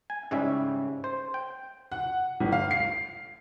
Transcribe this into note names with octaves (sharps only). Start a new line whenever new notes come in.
G#5
G#2 C#3 G3 C#4 E4 E5
C5
G5
F#5
G1
F5
C7